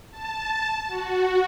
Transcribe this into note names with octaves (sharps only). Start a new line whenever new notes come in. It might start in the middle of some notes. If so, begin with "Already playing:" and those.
A5
F#4